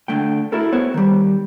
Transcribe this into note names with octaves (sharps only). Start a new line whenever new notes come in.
D3 A3 G5
E4 F#4 A4 A#4
B3 C5 C#5
D#3 G3